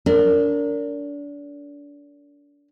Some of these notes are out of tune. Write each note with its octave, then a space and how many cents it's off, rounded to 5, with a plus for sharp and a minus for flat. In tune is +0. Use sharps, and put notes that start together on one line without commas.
D4 -30 A#4 -20